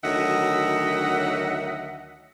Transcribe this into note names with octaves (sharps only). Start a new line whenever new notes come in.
D2 D#3 F#3 D#5 E5 F#5